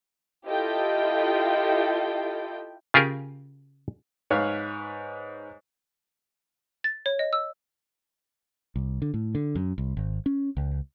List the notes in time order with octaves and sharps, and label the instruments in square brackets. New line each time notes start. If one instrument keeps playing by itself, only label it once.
[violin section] E4 F4 G4 A4 D#5 G5
[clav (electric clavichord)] C#3 F4 G4 G#4 A#4
[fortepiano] G#2 B4 C#5 F5
[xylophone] A6
C#5
D#5
E6
[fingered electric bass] C2
D3
A2
D3
F#2
C2
G#1
C#4
C#2